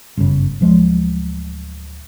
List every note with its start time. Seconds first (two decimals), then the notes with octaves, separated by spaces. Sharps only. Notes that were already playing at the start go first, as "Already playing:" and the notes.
0.17 G1 F#2 C#3
0.61 D1 F3 G#3